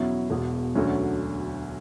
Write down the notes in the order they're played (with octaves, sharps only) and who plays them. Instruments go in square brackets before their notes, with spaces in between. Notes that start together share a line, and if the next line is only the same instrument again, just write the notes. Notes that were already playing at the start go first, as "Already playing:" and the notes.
Already playing: [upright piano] E2 B2 F#3 C#4 E4
E1 E2 B2
E1 D2 D3 F#3 C#4